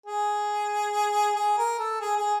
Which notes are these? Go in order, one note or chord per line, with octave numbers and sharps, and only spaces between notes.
G#4
G#4
A#4
A4
G#4
G#4